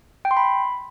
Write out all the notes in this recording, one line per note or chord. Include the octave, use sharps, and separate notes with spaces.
G5
C6
B5